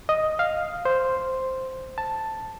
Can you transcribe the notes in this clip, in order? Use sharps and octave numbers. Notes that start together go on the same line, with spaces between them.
D#5
F5
C5
A5